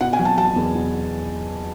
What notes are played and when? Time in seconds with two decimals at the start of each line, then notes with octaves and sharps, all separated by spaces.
0.01 B2 F#5
0.13 G#5
0.19 F#3
0.25 A5
0.37 F#3 A5
0.56 E2
0.75 B2